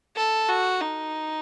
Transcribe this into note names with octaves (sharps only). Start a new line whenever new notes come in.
A4
F#4
D#4